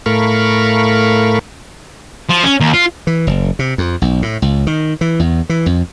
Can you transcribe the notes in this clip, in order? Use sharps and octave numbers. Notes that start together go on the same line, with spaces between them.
A2 A3 A#4 F5 B5 C#6
F3
C#4
D#2
F4
E3
F#1
C3
F2
B1
A2
C#2
D#3
E3
E2
E3
F2